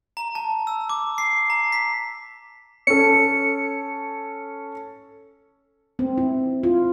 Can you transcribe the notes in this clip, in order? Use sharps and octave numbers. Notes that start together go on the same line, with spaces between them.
A#5
A5
E6
D6
C7
A#5
B6
C#4 A4 C#7
C4
E4
F4